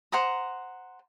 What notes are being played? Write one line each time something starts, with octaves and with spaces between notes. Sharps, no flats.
C5 F#5 A#5 D#6